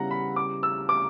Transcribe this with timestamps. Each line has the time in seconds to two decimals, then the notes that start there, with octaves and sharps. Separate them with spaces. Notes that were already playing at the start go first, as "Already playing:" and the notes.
Already playing: C#3 G3 B3 E4 F#5 A#5
0.11 B5
0.36 D6
0.63 E6
0.89 D6